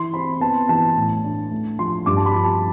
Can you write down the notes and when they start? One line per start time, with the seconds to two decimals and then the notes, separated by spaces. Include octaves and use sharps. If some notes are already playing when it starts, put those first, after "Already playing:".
Already playing: E3 E4 C6
0.14 C4 B5
0.40 B3 A5
0.69 E3 A5
0.96 A2
1.24 D4
1.51 A3
1.79 F3 C6
2.06 G2 D6
2.17 A5
2.26 B5
2.35 F3
2.44 A5